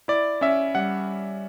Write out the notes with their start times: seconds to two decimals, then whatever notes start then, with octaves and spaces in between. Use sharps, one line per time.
0.08 E4 D5
0.41 C#4 E5
0.75 G3 F#5